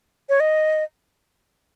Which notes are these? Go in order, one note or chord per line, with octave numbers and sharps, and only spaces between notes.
C#5
D#5